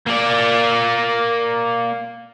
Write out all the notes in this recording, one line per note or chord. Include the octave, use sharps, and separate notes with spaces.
A#3 D5